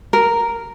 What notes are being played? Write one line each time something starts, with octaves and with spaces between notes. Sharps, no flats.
A#4